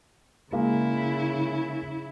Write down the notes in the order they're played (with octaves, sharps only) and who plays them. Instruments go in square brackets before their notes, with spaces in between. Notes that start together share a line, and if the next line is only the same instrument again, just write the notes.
[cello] C#3 E4 [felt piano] G#3 A#3